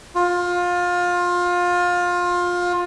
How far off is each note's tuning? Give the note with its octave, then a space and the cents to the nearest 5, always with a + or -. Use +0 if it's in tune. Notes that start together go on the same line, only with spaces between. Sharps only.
F4 +25